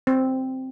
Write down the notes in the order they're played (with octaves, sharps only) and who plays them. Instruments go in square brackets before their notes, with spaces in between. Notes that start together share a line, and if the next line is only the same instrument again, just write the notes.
[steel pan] C4